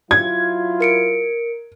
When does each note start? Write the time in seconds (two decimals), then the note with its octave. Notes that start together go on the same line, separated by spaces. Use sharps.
0.11 F#3 E4 F4 G#6
0.80 A#4 C#7 D7